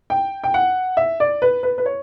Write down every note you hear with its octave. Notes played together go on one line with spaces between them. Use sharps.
G5
G5
F#5
E5
D5
B4
B4
B4
C#5